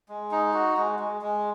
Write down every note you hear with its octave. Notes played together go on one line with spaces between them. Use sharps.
G#3
D#4
F#4
G#3
G#3
G#3